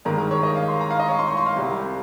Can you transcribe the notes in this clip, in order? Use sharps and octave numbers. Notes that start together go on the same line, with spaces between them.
G#1 G2 D#3 G#3 A#4
A#4
C#5
D#5
F5
C6
A#5
F5
D#5
C#5
C6
C#6
C6
F5
C2 C3 G3